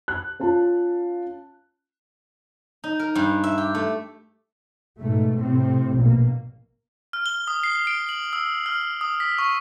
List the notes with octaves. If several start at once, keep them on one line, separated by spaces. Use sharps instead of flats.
F#6
C#4 F4 A5
D#4
A#4
G2
E5
G4
A3
G#2 B2 A3
A2 C3 C4
A#1 B2 A#3
F6
G7
D#6
C7
D7
F#7
E6
F6
D#6
B6
C#6